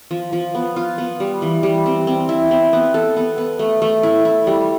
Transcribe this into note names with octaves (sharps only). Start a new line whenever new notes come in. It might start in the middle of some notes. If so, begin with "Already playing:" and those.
F3
F3
B3
F4
B3
G3
E3
G3
C4
C4
E4
C4
B3
A4
B3
B3
A3
A3
E4
E4
G3